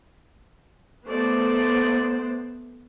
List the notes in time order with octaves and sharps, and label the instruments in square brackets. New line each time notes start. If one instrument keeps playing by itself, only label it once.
[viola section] A3 D5 [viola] B3 C5